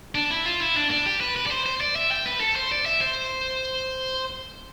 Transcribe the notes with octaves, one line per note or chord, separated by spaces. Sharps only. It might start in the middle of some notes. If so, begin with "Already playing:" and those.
D4
E4
F4
E4
D4
D4
G4
B4
B4
D5
C5
C5
D5
E5
G5
B4
A4
C5
D5
E5
C5